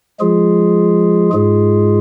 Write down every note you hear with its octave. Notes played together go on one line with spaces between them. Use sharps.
F3 G#3 F4 G#4
G#2 G#3 F4 G#4